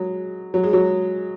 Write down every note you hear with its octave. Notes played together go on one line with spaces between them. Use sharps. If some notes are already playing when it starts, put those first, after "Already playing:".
Already playing: F#3 G#3
F#3
G#3
F#3